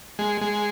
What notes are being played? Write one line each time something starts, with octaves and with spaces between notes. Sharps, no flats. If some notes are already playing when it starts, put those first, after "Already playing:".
G#3
G#3